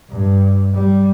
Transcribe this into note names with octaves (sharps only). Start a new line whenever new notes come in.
G2
G3